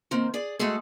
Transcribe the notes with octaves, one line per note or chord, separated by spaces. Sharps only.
D#3 A#3 C4
G#4 D5
G#3 A3 F#4 G#4 A4